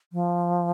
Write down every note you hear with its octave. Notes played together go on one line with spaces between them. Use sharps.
F3